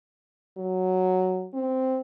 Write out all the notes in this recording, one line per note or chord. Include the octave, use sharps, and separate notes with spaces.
F#3
C4